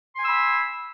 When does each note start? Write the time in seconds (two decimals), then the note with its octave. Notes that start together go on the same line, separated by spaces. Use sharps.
0.15 C6
0.19 G#5
0.23 E6
0.27 B5